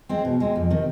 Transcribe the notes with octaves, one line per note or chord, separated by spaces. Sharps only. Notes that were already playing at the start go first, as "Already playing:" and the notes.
G#3 C4
B2
G#3 C4
F2
C3 D#3